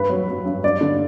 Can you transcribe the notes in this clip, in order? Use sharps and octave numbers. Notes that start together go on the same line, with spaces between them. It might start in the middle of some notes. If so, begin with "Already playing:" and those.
Already playing: G2 B4
F#3
F#3
G2
G2 D5
D3